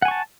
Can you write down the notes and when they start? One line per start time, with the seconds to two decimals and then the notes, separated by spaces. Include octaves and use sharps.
0.02 F#5
0.05 G#5
0.08 C#6
0.11 A5